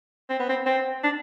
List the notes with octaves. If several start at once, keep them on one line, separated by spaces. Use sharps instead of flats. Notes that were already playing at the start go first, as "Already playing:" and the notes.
C4
B3
C4
C4
D4